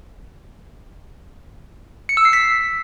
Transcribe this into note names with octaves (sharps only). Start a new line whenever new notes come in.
C#7
E6
C7
B6